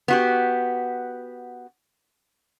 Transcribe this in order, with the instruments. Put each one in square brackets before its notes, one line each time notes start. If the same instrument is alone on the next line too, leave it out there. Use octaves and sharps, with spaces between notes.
[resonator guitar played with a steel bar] B3 F#4 G4